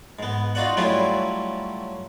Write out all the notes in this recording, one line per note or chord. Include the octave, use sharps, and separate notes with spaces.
G#2 B3
D#4 F4 F#4 D5 F#5
F#3 G3 A3 C#4 E4 F4